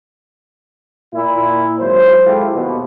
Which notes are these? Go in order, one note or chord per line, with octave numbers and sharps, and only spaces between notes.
A#2 E4
G#1 F#3 C5
G#3 E4 F4 G4 A4
D#2 B2